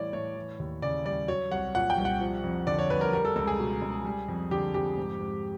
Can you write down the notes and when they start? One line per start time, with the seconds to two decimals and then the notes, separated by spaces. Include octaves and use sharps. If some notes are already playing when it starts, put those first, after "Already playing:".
Already playing: A2 E3 G3 C#5 D5
0.13 A2 C#5
0.36 E3
0.59 D#2
0.82 C#3 D5
1.05 G3 D5
1.28 F#3 C#5
1.52 C2 F#5
1.75 A#2 F#5
1.90 G5
1.98 C2
2.05 F#5
2.21 F3
2.44 F2
2.67 D3 D5
2.79 C#5
2.90 F2 B4
3.01 A#4
3.13 G3 A#4
3.25 A4
3.36 C#2 A4
3.47 G#4
3.59 B2
3.82 C#2
4.05 G3
4.28 F2
4.51 D3 G4
4.74 F2 G4
4.97 G#2
5.21 G#2